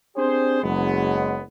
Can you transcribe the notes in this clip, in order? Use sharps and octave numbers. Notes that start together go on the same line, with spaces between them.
C4 D4 G4 G#4 C5
F#1 F#3 G#3 B3